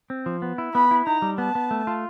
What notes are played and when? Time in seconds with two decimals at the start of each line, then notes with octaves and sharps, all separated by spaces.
0.10 C4
0.26 F3
0.42 B3
0.58 E4
0.74 B3 B5
0.91 E4
1.07 D#4 A#5
1.22 G3
1.38 B3 A5
1.55 B3
1.71 A3
1.87 F4